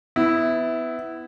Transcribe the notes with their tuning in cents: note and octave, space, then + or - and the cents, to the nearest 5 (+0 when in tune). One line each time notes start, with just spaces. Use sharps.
B3 +20 E4 -10